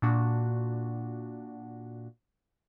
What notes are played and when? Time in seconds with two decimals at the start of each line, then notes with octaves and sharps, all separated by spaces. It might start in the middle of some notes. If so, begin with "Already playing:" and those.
0.02 A#2 D4 F#4